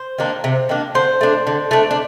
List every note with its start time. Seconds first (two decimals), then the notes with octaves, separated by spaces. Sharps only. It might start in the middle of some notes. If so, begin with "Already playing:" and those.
Already playing: C5
0.18 D#3 A#3 D4
0.44 C3
0.69 D#3 A#3 D4
0.95 D3 C5
1.21 A3 D4
1.47 D3
1.71 A3 D4
1.91 D4